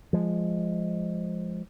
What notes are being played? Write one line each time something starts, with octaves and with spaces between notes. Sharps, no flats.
F3 G#3